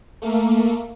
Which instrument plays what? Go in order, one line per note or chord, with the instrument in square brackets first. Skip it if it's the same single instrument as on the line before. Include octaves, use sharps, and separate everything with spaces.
[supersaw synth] A3 A#3